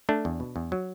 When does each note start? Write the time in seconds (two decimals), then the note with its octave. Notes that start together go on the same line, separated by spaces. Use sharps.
0.09 A3 D4
0.25 E2
0.40 B2
0.56 E2
0.72 F#3